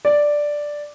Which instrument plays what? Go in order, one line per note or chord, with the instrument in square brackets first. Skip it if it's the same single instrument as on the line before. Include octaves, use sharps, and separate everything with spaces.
[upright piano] D5